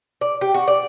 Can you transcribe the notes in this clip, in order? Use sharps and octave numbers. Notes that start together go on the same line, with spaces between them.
D5
G4
F#4
D5